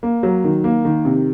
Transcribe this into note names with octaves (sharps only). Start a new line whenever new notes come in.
A#3
F#3
D#3
A#3
D#3
C3